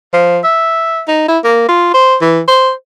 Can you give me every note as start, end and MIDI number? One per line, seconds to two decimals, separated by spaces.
0.13 0.39 53
0.44 1.01 76
1.08 1.24 63
1.29 1.39 64
1.44 1.64 58
1.69 1.92 65
1.94 2.16 72
2.21 2.40 52
2.48 2.71 72